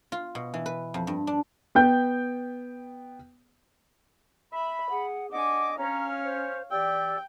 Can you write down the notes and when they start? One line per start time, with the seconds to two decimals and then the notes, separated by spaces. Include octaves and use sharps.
0.12 F4
0.35 B2
0.54 E3
0.66 B4
0.94 F2
1.07 G2
1.27 D4
1.75 B3 G5 G6
4.53 E5 B5
4.90 G#4 F#5
5.32 D4 D#5 F#5 G#5 D6
5.78 C#4 C#5 F5 A#5
6.24 C5
6.71 E3 G4 D5 G5 E6